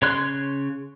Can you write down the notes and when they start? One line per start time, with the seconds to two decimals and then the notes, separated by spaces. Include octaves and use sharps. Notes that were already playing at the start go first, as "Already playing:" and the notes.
0.02 C#3 C#5 C6 F#6